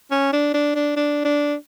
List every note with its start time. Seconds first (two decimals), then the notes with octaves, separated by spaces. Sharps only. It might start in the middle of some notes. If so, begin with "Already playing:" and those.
0.11 C#4
0.33 D4
0.54 D4
0.75 D4
0.96 D4
1.25 D4